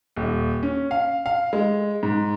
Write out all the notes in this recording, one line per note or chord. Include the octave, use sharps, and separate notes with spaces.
D#1
C#4
F5
F5
G#3
G#2